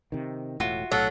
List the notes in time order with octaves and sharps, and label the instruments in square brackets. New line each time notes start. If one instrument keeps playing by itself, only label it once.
[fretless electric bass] C3 D#3
[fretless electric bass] E1 A2 [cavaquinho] F4 F#4 E5
[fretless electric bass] B1 A2 [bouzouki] F#3 [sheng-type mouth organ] A4 F#5 [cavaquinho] F5